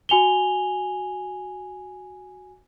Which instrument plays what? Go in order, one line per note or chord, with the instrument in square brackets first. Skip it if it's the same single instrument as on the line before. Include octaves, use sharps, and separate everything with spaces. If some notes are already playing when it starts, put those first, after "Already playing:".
[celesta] F#4 G#5 F7 G7